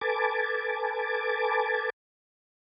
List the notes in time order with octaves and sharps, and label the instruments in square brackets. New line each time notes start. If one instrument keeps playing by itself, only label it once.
[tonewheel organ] A4 B4 G#5 A5 D6